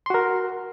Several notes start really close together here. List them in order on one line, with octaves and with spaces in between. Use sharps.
C6 F#4 A#4